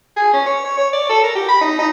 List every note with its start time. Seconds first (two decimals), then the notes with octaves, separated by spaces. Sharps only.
0.16 G#4
0.33 C#4
0.46 C#5
0.65 C#5
0.77 C#5
0.93 D5
1.09 A4
1.24 A#4
1.35 G4
1.49 B5
1.61 D#4
1.79 D#4